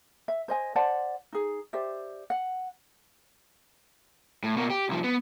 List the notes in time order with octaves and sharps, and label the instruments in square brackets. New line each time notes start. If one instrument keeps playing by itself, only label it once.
[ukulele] E5
C5 D#5 G#5
C5 D5 F#5 A5
D#4 G#4
G4 C5 D5 E5
F#5
[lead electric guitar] A2
B2 A#3
G4
C2 F3
B3